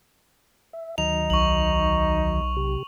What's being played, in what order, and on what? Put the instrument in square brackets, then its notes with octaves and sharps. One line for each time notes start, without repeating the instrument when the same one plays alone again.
[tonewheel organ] E5
[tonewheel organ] D2 D#3 F#3 [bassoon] D#4 [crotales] F7
[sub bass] B1 [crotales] C#6 F#7
[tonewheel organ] C3 G4